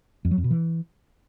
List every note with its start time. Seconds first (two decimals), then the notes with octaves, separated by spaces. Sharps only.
0.25 F2
0.31 F#3
0.38 F2
0.44 B2
0.51 E3